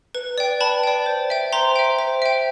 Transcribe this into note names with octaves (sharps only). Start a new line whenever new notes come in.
B4
D5 G5
B4 A5 B5
D5 G5
C5
E5 G5
C5 A#5 C6
E5 G5
C5
E5 G5